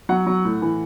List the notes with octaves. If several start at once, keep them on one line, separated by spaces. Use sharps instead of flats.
F#3 F#5
F#3
A2
E3